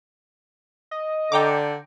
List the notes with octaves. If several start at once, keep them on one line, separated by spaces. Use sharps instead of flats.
D#5
D3 G5 A#5 D6